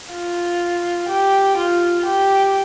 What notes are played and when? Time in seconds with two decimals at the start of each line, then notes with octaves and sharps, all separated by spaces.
0.11 F4
1.09 G4
1.57 F4
2.05 G4